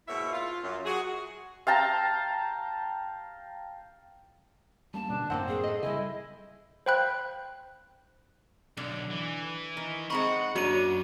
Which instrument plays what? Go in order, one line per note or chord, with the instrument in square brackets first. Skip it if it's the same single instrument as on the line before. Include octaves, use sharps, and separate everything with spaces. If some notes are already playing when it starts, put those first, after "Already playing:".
[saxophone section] G#2 B2 A#3 E4 C#5 E5
F4
F#2
F#4 G#4
[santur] F5 G5 A5 A#5
[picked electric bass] G3 A#3 C#4 [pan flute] A5
[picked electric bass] B2 D3 [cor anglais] D4
[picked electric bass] F#2 A2 [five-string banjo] A#3 D#4 F#5 [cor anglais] C4
[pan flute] G#4
[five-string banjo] A4 D#5
[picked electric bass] C#3 G3 [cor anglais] E4 [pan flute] D#5 [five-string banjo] G#5
[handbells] C5 F5 G5 B5 F#6 G6
[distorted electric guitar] B1 [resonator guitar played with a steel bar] D3
[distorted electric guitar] E3
[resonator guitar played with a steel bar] D#3
[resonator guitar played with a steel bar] G#3 C4 D#4 [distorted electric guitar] F#5 [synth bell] B5 C#6
[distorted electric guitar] F#2 [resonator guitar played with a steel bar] A#3 D4 C#5 [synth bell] F#4 D#7